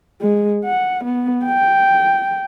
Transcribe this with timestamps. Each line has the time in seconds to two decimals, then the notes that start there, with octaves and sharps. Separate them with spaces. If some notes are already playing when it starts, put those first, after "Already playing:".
0.21 G#3
0.65 F#5
1.04 B3
1.45 G5